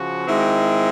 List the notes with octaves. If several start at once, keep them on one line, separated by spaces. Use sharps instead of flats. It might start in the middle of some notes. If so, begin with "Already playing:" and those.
Already playing: C#3 F3 F#4
D#3 G#3 C4 E4